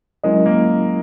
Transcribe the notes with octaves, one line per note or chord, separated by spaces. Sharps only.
F#3 G#3 C#4 E4 A#4 D#5
A#3